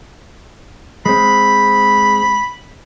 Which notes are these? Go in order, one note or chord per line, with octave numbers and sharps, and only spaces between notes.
G#3 C4 B5